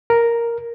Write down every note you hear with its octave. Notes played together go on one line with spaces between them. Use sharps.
A#4